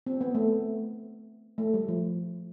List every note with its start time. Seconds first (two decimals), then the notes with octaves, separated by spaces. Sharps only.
0.06 C4
0.21 B3
0.35 A3
1.58 A3
1.74 G3
1.88 F3